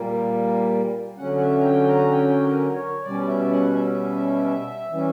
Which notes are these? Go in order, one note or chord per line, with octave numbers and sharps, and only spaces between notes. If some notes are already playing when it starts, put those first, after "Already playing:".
Already playing: A#2 G3 A#3
D3 F#3 C#4 F#5
F#5
E5
A#5
G5
A#5
G5
A#4
C#5
B2 G3 C#4 D5
E5
F#5
E5
E3 G3 C#4